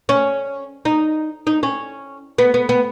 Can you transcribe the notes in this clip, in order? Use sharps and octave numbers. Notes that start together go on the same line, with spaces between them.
C#4
D#4
D#4
C#4
B3
B3
B3